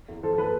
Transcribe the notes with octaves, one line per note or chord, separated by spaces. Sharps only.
E2
F3 A4 C5
A4
F3 G#4 B4